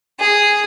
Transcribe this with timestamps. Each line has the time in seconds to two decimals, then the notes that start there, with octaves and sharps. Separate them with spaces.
0.20 G#4